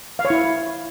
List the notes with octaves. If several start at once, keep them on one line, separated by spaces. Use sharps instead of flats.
F5
C#5
E4